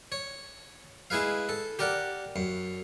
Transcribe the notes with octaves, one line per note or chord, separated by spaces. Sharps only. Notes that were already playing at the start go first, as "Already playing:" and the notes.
C#5
G#3 E4 G#4 B4 F5
A4
G4 A#4 D5 F#5
F#2